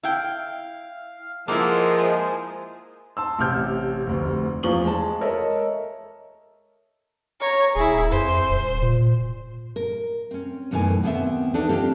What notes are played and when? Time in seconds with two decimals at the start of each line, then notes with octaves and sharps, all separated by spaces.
0.03 E4 F5 G5
1.48 F3 G#3 A#3 E4 A4 A#4 C5 F#5
1.94 C5 G#5
3.17 A5 C6 E6
3.39 A1 C3 F6 G6
4.07 F1 D2
4.63 E2 F3 F4 C#6 F#7 G7
4.85 G#3 A5
5.21 A4 A#4 C#5 D#5 E5
7.41 C#5 A#5
7.75 D#1 E4 G#4
8.12 F2 C5
8.50 D#1
8.82 A#2
9.76 A#4
10.31 C4 C#4
10.71 F#2 B2 D#3 E3 A3 G#5
11.04 D#2 B3 C4 C5 D#5 E5
11.54 E3 D4 D#4 A4 D5
11.69 C4 D4 F4 G4 C5 C#5